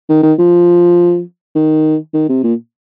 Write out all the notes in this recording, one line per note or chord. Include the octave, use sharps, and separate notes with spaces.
D#3
D#3
F3
D#3
D#3
C3
A#2